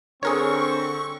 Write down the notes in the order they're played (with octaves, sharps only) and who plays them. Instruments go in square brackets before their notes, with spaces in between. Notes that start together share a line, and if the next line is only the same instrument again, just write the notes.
[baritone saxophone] D3 [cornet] C4 [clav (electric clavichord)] G#4 A#4 C#5 [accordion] C#6